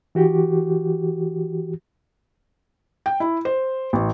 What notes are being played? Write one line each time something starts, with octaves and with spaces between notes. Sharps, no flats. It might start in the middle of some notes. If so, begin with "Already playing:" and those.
E3 F#4 G4
G5
E4
C5
A1